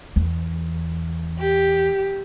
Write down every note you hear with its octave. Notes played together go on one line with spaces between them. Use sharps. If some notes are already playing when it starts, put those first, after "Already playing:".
E2
G4